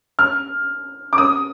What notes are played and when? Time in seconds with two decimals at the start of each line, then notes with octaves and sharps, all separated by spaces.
0.19 F6
1.13 D6
1.18 D#6